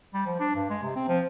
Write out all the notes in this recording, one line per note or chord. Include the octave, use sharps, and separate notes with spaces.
G3
F3
D4
G2
G#3
C3
C4
F3